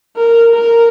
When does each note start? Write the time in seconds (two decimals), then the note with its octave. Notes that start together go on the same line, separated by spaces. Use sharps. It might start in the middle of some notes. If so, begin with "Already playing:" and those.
0.17 A#4
0.55 A#4